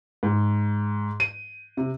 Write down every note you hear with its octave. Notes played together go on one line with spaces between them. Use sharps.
G#2
D#7
C3